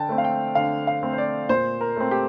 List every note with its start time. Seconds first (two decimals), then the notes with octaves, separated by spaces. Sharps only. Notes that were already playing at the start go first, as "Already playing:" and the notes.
Already playing: D3 G5 A5
0.09 A3 C4
0.18 F5
0.24 G5
0.55 D3 F5
0.87 F5
1.03 A3 C4
1.13 C5
1.18 D5
1.49 A#2 C5
1.81 A#4
1.96 A3 C4
2.11 G4